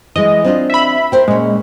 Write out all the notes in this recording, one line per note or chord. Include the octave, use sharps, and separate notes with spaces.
E3 G#3 D#5
C4 D4 F4
E5 B5
A#4 C5 G5
A#2 G#3 C#4